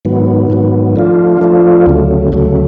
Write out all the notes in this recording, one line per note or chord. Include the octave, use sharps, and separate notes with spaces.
G#2 D#3 F#3 B3
G#2 D#3 F#3 B3
F3 A3 D4 F4
F3 A3 D4 F4
D2 C#3 F#3 A3
D2 C#3 F#3 A3